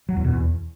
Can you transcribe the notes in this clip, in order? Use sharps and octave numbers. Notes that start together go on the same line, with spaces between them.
F#3
E2
B2
E2